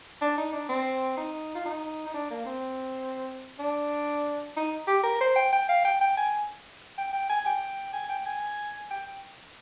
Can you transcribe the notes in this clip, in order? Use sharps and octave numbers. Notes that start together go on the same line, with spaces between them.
D4
D#4
D4
C4
D#4
F4
D#4
D#4
D4
A#3
C4
D4
D#4
G4
A#4
C5
G5
G5
F5
G5
G5
G#5
G5
G5
G#5
G5
G#5
G5
G#5
G5